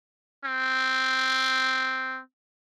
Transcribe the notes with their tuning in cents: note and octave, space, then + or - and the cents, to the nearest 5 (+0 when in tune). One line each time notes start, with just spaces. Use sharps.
C4 -5